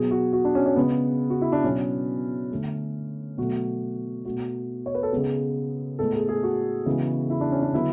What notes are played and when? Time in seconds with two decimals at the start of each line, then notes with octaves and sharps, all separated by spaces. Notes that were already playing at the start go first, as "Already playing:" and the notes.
Already playing: B2 F#3 B3 G#4
0.11 F#4
0.33 F#4
0.45 D4
0.55 C#4
0.66 C#4
0.76 C#3 G#3 B3
1.30 F#4
1.42 E4
1.52 D4
1.64 B2 F#3 B3 C#4
2.51 D3 A3
3.38 B2 F#3 A3 F#4
4.25 B2 A3 F#4
4.86 C#5
4.95 B4
5.03 A4
5.12 C#3 G#3 B3 G#4
5.99 A2 G#3 B3 A4
6.14 G#4
6.29 G#4
6.43 F#4
6.86 C#3 E3 G#3 B3
7.30 E4
7.41 D4
7.52 C#4
7.62 D4
7.73 D3 F#3 B3 E4